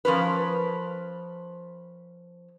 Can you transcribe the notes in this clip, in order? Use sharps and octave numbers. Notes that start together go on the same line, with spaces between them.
F3 C#4 A#4 B4